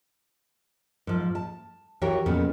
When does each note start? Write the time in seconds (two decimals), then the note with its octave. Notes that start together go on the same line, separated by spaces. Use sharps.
1.07 G#2 F3
1.35 A5
2.02 E3 F#4 G4 A#4 C#5
2.26 F2 A#2 C#3 B3